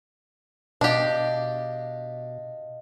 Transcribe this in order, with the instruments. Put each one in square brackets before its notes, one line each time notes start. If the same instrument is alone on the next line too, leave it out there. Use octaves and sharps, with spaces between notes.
[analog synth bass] B2 [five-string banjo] D4 G4 [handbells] D#5 F5